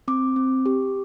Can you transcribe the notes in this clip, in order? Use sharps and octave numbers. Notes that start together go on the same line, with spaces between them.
C4 D6
C4
G4